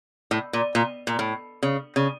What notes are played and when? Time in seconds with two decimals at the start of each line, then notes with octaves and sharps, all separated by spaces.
0.31 A2
0.53 A#2
0.75 A#2
1.07 A#2
1.19 A2
1.63 C#3
1.96 C#3